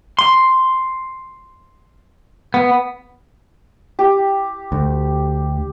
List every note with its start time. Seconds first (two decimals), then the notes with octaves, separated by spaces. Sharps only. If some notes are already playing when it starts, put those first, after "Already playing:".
0.19 C6
2.54 B3
3.99 G4
4.72 D2